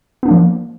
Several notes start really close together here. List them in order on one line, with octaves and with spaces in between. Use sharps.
B3 D4 A#3 F3